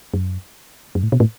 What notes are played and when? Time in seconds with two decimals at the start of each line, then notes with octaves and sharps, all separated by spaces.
0.14 F#2
0.95 F#2
1.03 A2
1.12 B2
1.20 A2